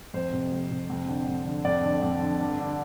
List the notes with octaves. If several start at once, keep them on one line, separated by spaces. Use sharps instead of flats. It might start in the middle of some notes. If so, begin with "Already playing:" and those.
F2 C5
C3
F2
C3
F2
D3
F2
D3
F2 D5
D3
F2
D3
G2
D3